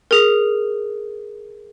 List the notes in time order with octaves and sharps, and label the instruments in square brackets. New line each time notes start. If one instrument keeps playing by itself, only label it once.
[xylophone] G#4 A#4